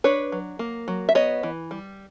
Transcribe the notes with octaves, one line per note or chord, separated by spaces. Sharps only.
D4 B4 C#5
F#3
A#3
F#3
E5
B3 C#5 D#5
E3
G3